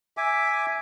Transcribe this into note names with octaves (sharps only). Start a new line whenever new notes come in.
E5 G#5 D6